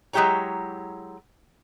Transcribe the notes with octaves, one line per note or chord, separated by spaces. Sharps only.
F#3 G#3 E4 G4 C#5 A#5